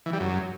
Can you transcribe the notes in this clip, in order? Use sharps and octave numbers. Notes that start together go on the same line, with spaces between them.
E3
G3
F#2